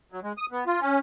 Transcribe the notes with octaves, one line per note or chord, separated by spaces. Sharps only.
F#3
G#3
D#6
B3
F4
C#4